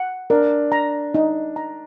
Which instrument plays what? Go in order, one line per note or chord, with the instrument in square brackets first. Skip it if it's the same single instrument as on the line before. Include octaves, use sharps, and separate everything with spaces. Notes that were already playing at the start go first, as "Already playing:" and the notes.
Already playing: [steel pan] F#5
[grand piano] D4 [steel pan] A#4
[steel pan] A#5
D#4
A#5